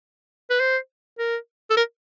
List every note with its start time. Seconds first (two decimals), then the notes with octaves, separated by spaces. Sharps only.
0.50 B4
0.60 C5
1.19 A#4
1.70 A4
1.77 A#4